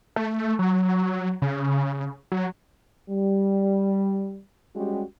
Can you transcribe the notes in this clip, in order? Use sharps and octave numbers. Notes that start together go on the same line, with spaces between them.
A3
F#3
C#3
F#3
G3
G3 G#3 C#4 F#4 G4